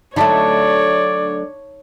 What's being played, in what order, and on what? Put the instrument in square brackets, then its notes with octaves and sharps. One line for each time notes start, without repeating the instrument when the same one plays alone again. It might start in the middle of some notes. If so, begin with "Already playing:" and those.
[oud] D3 F#3 A3 [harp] D#4 A4 B5 [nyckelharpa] C#5 [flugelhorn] D5